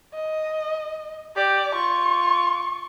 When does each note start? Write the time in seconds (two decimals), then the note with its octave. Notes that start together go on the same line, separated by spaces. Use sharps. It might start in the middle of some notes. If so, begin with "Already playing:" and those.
0.14 D#5
1.36 G4 D5
1.75 F4 C#6